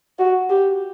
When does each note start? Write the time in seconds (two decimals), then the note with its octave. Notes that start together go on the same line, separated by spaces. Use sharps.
0.19 F#4
0.49 G4